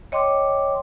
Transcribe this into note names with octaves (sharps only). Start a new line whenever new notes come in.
C#5 D#5 G5 C6 D6